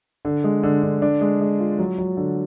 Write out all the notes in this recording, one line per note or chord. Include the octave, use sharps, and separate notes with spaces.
D3
G#3
D3
D3
D4
G#3
G#3
F4
F#3
F#3
D3